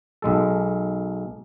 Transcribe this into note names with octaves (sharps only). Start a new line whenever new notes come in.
B1 G#3 A4